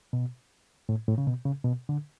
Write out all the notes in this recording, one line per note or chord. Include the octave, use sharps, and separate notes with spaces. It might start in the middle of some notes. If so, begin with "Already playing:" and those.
B2
A2
A2
C#3
B2
C#3
B2
D3